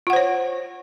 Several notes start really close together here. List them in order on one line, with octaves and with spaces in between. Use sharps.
F4 F#5 C5 C#5